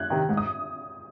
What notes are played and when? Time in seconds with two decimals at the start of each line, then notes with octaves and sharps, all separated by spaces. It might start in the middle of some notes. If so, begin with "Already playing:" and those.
Already playing: F#6 G#6
0.10 C3 D#3
0.29 G#2
0.37 D#6